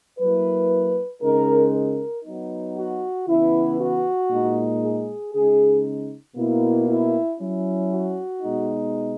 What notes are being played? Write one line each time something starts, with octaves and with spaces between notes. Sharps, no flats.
F#3 A#3 E4 B4
C#3 G#3 D#4 A#4
A#4
F#3 B3 D#4
F#4
C#3 E3 B3 E4
F#4
A#2 G#3 D#4
G#4
C#3 G#3 D#4 G#4
B2 A#3 E4
E4
F#3 C#4 E4
F#4
B2 G#3 D#4